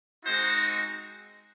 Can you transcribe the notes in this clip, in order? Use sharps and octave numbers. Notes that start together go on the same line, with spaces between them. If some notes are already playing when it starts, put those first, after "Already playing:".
G#3 C4 D#4 F#4 C5